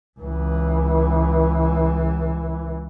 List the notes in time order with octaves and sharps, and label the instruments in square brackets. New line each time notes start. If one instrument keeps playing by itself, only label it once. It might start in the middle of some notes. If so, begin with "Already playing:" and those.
[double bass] C#2 E3